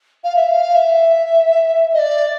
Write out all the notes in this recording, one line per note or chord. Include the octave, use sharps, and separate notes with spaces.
F5
E5
F5
E5
D#5
D5